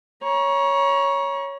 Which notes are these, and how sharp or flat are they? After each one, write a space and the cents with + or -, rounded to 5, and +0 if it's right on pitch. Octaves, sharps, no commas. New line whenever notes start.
C#5 +0 A#5 +35